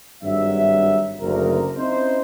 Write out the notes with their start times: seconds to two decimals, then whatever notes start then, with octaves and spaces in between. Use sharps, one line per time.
0.22 G#1 G2 F#3 E5
1.20 F#1 D2 A#4
1.77 C4 C#4 D#4 E4 C5